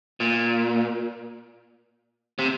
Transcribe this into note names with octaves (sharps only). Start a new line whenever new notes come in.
A#2
C3